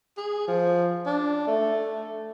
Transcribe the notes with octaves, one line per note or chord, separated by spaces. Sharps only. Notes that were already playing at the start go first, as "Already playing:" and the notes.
G#4
F3
D4
A3